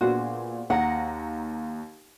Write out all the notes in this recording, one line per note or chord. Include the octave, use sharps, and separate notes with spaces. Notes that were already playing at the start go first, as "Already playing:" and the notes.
A#2 B3 D4 F#4 G#4 C5
D#2 F#5 A#5 A#6